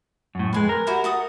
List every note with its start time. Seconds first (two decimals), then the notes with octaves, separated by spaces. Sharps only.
0.35 F#2 A2
0.53 F2 G#3 B4 G#5
0.69 A#4
0.87 E4 F#4 G4
1.04 F#4 A4 D#6